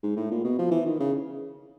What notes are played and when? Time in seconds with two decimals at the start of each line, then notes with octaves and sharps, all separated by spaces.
0.03 G#2
0.16 A2
0.31 A#2
0.44 B2
0.59 F3
0.71 E3
0.86 D#3
1.00 C#3